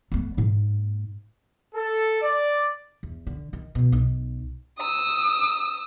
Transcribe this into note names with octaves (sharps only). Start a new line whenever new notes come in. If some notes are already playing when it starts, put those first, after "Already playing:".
A3 B3
G#2 A#3
A4
D5
E2
D3
D#3
B2 D#3
B1 D#4
D#6 E6